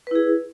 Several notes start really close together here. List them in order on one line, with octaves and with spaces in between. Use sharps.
B4 E4 G#4